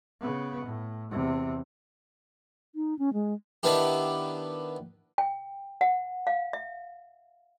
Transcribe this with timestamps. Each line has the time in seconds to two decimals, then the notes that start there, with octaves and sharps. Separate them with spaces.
0.21 C#3 B3
0.66 A2
1.11 E2 C3
2.75 D#4
2.99 C#4
3.13 G#3
3.63 D#3 B3 D4 E4 G4
5.18 G5
5.81 F#5
6.27 F5
6.53 E5